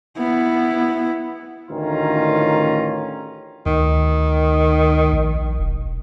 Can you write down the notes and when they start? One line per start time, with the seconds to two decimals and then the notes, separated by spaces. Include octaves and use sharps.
0.17 B3 E4
1.69 A1 D2 D#3 C#4 F4 A#5
3.66 D2 D#3
5.13 A#1
5.60 E1